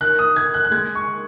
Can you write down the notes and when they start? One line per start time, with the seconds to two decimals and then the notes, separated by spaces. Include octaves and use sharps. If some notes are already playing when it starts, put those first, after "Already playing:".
0.01 D#3 F#6
0.19 D#6
0.36 D#3 G#6
0.54 F#6
0.64 F#6
0.71 G#3 G#6
0.95 C#6
1.07 D#3